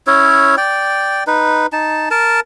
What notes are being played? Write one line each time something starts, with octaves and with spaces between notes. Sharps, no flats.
C#4 E4 C#5
D5 G5
D#4 B4
D#4 A5
A#4 A5